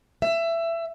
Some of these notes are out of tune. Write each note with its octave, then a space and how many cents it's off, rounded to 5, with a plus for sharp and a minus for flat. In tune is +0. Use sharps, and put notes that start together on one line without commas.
E5 +20